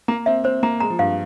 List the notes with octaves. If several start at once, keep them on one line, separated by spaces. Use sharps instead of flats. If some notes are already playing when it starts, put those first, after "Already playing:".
A#3 A#5
C4 E5
C4 C5
A#3 A#5
G#3 A#5
F3
G2 F5